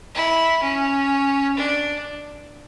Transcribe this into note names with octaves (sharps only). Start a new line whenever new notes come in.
E4
C#4
D4